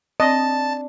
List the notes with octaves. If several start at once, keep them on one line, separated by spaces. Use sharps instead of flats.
C4 D4 D#5 A5